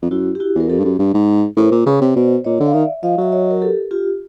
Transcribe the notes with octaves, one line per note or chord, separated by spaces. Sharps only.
F2
F#2 E4 F#4
G4
E4 F#4
E2 A#4
F2 G4 A4
G2
F#2
G2
G#2
A2 A#4 C5
A#2
C#3 B4 C#5
C3
B2 C5 D5
A#2 C#5 D#5
D3
F5
D#3 D5 E5
F3 D#5 F5
F#3 E5
C#5 D#5
A#4
G4 A4
F4 G4